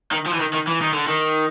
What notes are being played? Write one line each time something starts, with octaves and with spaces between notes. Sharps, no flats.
D#3
F3
E3
D#3
D#3
E3
D#3
D3
D#3